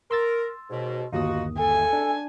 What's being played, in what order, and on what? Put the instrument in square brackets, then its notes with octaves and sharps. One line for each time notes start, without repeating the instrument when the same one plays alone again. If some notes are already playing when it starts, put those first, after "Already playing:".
[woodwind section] A#4 [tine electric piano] C6 E6 A6
[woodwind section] D#2 G#2 B2
[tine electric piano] G1 D#2 D#6 [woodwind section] D#4 F4 F#4
[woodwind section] A4 [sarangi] G#5
[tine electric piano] D4